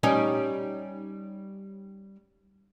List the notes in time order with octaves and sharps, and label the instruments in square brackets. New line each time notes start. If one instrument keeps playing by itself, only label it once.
[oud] G3 C#4 D#4